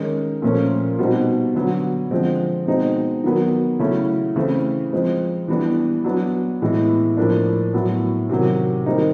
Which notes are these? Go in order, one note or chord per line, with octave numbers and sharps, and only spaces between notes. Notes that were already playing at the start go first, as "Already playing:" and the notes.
Already playing: D#3 G#3 C#4
A#2 F3 A3 C#4
B2 G3 C4 D#4
D3 F#3 B3
D3 F3 G#3 C4
B2 G#3 C4 D#4
D#3 F#3 B3
C#3 F#3 A3 C#4 E4
C#3 E3 A3 C4
F3 G#3 C4
E3 G3 B3 D4
F#3 B3 D4
A2 E3 G#3 B3
A2 F3 A#3 D4
A2 F#3 B3
C3 D#3 F#3
D#3 G3 C4 D#4